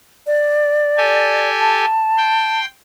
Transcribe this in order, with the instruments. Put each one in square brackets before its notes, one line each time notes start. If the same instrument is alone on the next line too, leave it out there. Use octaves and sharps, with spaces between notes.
[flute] D5
[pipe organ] G4 A4 G#5
[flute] A5
[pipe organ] G5 C6